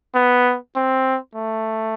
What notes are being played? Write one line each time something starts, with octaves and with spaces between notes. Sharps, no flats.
B3
C4
A3